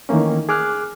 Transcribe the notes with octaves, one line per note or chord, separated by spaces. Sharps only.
D#3 E3 A3 A#3 C#4
G#4 D6 F6 F#6